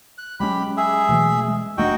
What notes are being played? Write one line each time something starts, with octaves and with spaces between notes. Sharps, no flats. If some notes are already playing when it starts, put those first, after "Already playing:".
F#6
F#3 G#3 C#4 G4 B5
G#4 E5
B2 E3 A3
G#3
F1 A3 D4 D#4 F#4 G5